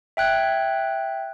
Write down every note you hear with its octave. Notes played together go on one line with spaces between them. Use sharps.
E5 G5 F#6 G#6